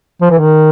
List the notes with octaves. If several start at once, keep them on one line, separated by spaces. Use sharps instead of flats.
F3
E3
D#3